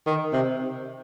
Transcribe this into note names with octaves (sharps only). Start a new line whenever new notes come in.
D#3
C3